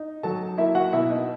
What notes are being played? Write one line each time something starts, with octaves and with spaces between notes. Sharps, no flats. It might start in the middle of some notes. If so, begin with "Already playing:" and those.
Already playing: D#4
F#3 A4 A5
A#3 E4 E5
F#4 F#5
B2 E4 E5
D#4 D#5